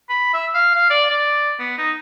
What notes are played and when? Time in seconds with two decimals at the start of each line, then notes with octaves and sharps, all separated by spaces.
0.09 B5
0.34 E5
0.54 F5
0.75 F5
0.90 D5
1.10 D5
1.59 B3
1.78 D#4